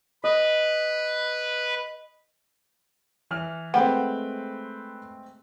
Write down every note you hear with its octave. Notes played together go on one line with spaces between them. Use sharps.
B4 D#5
E3 F6 F7
G#3 A3 C4 B4 C5 F#5 G5